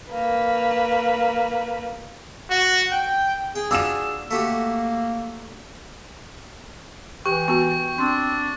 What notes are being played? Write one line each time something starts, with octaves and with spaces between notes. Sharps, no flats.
A#3 B4
F#4
G5
G#4 G5
D4 F4 F#4 E6 E7
A3 A#3 F#4 G4
E3 G4 G5 C#6
B3 F#4 C#6
C4 D4 C6